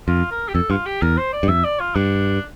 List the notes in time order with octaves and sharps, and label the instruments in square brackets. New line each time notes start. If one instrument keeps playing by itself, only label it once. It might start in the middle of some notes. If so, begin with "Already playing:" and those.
[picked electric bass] F2 [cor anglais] F4
[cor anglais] A#4
G4
[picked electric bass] F2 [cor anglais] A4
[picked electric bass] G2 [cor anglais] F4
[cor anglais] G4
[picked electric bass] E2 [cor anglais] A#4
[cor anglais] C5
D5
[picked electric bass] G2
[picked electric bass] F2 [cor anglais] E5
[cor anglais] D5
F4
[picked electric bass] G2 [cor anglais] D4